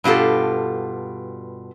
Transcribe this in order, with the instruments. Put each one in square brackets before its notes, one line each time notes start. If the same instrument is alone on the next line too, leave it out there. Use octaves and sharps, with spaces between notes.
[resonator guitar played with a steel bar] G2 B2 F4 G4 A4